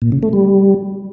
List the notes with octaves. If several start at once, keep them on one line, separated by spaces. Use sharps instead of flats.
A#2
C#3
A3
G3